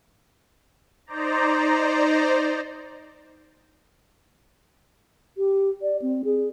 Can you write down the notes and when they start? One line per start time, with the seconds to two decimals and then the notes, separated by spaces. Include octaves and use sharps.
1.07 D#4 C5 D5 A#5
5.38 G4
5.82 D5
6.02 C4
6.25 G#4